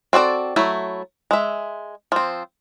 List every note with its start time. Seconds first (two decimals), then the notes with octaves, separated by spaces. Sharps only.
0.13 C4 F#4 A4 D5
0.56 F#3 A3 E4
1.31 G#3 E5
2.12 F3 C4